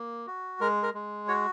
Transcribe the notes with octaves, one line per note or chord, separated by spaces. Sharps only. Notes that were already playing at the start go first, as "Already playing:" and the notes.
Already playing: A#3
F#4
G#3 A#4
A#4
G#3
F#4 C#5